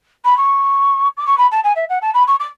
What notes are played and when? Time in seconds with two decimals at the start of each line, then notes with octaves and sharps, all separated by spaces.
0.25 B5
0.37 C#6
1.17 D6
1.27 C#6
1.38 B5
1.51 A5
1.64 G#5
1.76 E5
1.89 F#5
2.02 A5
2.14 B5
2.27 C#6
2.39 D6